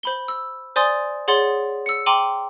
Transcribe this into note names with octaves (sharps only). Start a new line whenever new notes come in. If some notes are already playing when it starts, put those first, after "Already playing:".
C5 B5 G7
E6
C5 D5 G#5 C6 D#6 A6
G#4 C#5 F#5 C6 A6
E6 C#7
G5 A#5 C6 D6 D#7 F#7